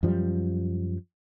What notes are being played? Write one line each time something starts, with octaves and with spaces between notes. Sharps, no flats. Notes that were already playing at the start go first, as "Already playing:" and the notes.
F#2 F3 G3